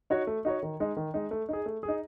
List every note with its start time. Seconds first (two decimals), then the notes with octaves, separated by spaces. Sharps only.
0.10 D#4 F#4 C#5
0.27 A3
0.45 D#4 F#4 C#5
0.63 D#3
0.80 G#3 D#4
0.97 D#3
1.14 G#3 D#4
1.31 A3
1.49 D#4 G#4
1.66 A3
1.83 G#4
1.88 D#4